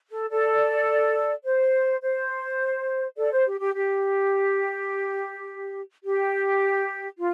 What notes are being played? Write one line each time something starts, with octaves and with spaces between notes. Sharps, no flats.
A4
A4 D5
C5
C5
A4 D5
C5
G4
G4
G4
G4
F4